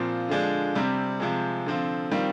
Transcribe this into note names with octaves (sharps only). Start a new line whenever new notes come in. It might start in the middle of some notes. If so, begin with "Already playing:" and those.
Already playing: A#2 F3 C4 F4
D3 F3 G#3 D4
C3 G3 C4
C3 F3 G#3
D3 F3 C4 F4
D#3 G3 C4 F4